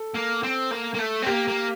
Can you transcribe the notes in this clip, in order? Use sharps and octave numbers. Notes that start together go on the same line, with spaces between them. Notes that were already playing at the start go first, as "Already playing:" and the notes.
Already playing: A4
A#3
C4
A#3
A#3
A3
C4
A#3 G4
A#3